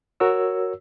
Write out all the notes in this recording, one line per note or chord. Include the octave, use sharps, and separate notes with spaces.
F#4 A#4 C#5 E6